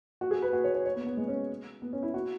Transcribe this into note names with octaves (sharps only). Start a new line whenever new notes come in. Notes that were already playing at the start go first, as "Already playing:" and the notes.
F#4
G#4
B4
F#4
C#5
C#5
C#5
B3
B3
G#3
C#4
B3
C#4
E4
F#4